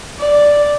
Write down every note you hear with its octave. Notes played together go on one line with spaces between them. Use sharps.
D5